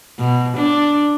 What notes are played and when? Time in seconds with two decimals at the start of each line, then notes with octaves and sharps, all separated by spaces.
0.19 B2
0.57 D4